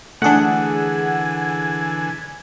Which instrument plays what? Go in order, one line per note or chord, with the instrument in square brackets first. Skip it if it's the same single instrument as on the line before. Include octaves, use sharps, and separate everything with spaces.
[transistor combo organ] D3 E3 [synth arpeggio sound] A3 D4 [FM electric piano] G#4 F#5 [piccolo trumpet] G#5